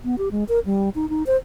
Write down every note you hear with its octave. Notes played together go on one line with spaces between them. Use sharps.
B3
G4
G#3
A#4
G3
D#4
D#4
C5